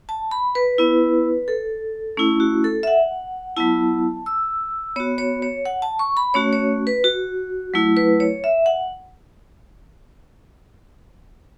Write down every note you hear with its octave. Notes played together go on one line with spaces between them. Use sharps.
A5
B5
B4
B3 E4
A4
A3 C#4 E4
F#4
A4
E5
F#5
F#3 B3 E4 A5
E6
B3 F#4 C#5
C#5
C#5
F#5
A5
C#6
B5
A3 C#4 F#4 C#5
C#5
B4
F#4
F#3 A3 E4
B4
C#5
E5
F#5